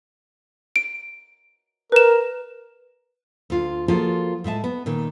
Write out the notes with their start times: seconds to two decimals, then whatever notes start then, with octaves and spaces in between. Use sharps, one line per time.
0.76 D7
1.92 A#4 B4 E7
3.50 D2 F4
3.88 F3 A#3 F4 F#4 G#4 A4
4.44 A2 G#3 E5 A5
4.64 B3
4.86 A#2 D#3